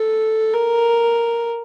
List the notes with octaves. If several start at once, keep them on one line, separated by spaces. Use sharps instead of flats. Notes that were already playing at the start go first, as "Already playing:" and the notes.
Already playing: A4
A#4